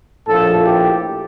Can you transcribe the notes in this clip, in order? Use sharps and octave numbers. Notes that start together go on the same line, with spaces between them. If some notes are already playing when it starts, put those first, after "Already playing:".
A#1 A2 F3 A4
G4